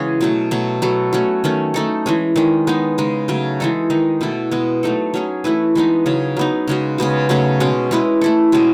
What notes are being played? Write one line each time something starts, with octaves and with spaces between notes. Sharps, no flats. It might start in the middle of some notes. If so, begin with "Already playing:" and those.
Already playing: C#3 E3 G#3 C#4 F#4 G#4
B2 F#3 A3
B2 F#3 A3
F#3 B3 F#4 A4
A3 C#4 F#4
D#3 A3 C#4
A3 D#4 A4
E3 G#3 C#4
D#3 G#3 C#4
G#3 B3 D#4
C#3 G#3 D#4
C#3 F#3 A3
E3 G#3 D#4 A4
D#3 G#3 D#4
B2 A3 E4 A4
B2 G#3 B3
F#3 A3 D#4 A4
F#3 C#4 G#4
E3 A3 E4 B4
E3 G#3 B3 D#4
C#3 F#3 C#4
F#3 B3 D#4
C#3 G#3 C#4 F#4
C#3 G#3 B3 F#4
C#3 F#3 A3 C#4
B2 G#3 C#4
G#3 C#4 E4 B4
A3 E4 A4
B2 G#3 C#4 G#4